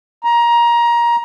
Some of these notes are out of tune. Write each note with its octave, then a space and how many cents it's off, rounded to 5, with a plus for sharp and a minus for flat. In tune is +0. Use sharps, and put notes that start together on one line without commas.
A#5 +20